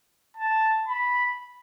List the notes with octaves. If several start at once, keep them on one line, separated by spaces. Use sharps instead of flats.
A5
B5